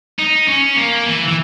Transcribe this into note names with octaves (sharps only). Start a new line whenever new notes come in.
D#4
C#4
A#3
E3
E3